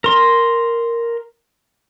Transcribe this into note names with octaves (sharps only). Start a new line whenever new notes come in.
A#4 C6